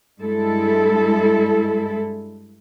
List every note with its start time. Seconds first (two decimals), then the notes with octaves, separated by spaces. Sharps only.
0.20 G2 G#3 E4 A4